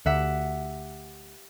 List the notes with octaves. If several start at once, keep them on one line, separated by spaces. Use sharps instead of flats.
D2 G4 E5 F#5